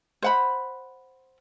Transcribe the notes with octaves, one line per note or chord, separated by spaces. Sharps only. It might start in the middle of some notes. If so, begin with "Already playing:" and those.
C5 F#5 B5